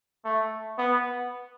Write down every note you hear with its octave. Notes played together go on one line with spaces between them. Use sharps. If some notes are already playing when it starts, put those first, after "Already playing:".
A3
B3